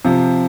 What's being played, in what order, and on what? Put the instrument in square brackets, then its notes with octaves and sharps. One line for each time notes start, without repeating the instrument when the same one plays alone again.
[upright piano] C3 [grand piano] F3